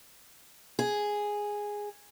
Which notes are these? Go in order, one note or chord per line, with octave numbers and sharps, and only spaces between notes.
G#4